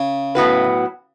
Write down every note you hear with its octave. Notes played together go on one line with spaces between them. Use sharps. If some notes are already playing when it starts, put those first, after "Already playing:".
Already playing: C#3
A2 F#3 B3 F#4 B4